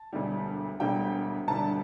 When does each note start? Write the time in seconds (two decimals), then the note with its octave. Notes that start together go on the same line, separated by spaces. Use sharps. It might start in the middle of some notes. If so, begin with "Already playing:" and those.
Already playing: A5
0.13 E1 D2 D3 G3
0.80 E1 D2 D3 G3 G5
1.48 E1 D2 D3 G3 A5